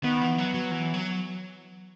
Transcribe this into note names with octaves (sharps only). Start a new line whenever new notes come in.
D#3 B3
E3
F#3
F#3
E3
F#3